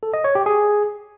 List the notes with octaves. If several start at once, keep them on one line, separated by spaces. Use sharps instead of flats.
A4
D#5
C#5
G4
G#4